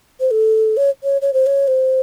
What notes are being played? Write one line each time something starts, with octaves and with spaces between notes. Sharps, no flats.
C5
A4
C#5
C#5
C#5
C5
C#5
C5